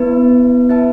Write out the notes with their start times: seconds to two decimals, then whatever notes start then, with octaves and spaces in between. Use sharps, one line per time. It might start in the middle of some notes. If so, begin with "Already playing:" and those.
Already playing: B3 E4 B4
0.69 E4 B4 E5 A5